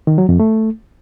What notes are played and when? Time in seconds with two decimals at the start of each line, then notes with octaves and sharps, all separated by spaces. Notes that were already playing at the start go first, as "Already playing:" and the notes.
0.07 D#3
0.18 F#3
0.29 F2
0.40 A3